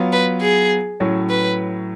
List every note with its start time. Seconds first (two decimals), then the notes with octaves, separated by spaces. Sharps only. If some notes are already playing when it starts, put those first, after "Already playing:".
Already playing: F#3 B3 F4
0.13 B4
0.41 G#4
1.00 A2 F#3 C#4
1.30 B4